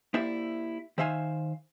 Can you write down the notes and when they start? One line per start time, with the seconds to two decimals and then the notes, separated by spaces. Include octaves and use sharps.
0.14 A#3 E4 G4 C5 D5 E5
0.98 D#3 C5 E5 F5 G#5